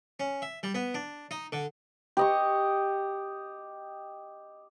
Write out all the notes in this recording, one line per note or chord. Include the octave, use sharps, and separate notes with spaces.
C#4
E5
G3
B3
D4
D#4
D3
G4 D#5 C#6